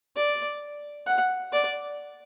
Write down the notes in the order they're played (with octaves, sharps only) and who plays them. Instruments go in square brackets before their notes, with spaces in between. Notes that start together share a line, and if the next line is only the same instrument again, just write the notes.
[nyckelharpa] D5
F#5
D5